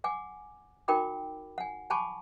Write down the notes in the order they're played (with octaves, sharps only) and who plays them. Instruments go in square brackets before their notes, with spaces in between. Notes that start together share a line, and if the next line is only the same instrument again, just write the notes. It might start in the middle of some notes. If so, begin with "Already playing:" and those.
[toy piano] F#5 G#5 D6
D#4 F#4 A#4 G5 B5 D6
F#5 G#5
F#5 G#5 A5 B5 C#6 D6